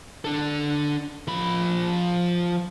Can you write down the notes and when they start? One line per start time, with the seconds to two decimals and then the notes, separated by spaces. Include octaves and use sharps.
0.25 D4 A4
1.28 F3 B5